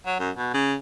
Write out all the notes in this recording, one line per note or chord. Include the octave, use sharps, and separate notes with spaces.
F#3
F#2
B2
C#3